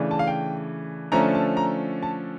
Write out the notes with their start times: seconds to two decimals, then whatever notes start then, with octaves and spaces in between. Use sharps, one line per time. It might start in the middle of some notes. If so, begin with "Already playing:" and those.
Already playing: C#3 E3 A3 D4
0.11 A5
0.19 F5
0.27 G5
1.12 D3 F3 A3 C#4 A#5
1.35 A5
1.57 A#5
2.03 A5